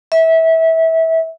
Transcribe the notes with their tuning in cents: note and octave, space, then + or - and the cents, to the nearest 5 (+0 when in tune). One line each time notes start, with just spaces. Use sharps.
E5 -25